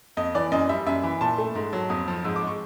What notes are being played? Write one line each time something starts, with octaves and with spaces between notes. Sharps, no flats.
F2 D#5
E3 D5
F#2 D#5
G3 E5
F#2 E5
E3
A#2 A5
A3
G#2
F#3
F2 D#6
F3
G#2 E6
D6
G#3
C#6